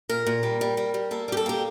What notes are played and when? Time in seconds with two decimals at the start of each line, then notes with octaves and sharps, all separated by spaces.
0.10 A#2 A#4
0.27 A#2
0.43 G3
0.61 G3
0.77 G3
0.94 G3
1.11 A#3 A4
1.28 G3 G4
1.37 A4
1.46 A#3 G4